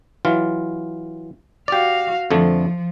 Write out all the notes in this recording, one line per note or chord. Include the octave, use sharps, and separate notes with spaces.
E3 F#3 F4
F#4 G4 D5 F5
F2 D3 F3 A3